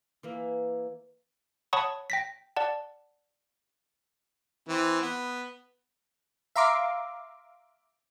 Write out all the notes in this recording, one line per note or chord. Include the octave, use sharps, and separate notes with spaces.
E3 A#3 E4
C#5 F#5 A5 B5 C#6 D#6
G5 A#6 B6
D5 F#5 A5
E3 C4
B3
E5 F5 A#5 C6 D6